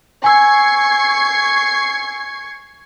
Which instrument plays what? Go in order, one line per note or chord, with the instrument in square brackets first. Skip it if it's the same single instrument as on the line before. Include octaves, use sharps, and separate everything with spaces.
[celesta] G#5 E6 [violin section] C#6 G#6 C7